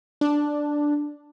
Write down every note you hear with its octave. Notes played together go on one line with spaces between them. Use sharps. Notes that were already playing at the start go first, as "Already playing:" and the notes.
D4